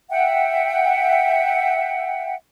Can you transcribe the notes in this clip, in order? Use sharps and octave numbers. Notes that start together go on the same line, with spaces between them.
E5 F#5 G5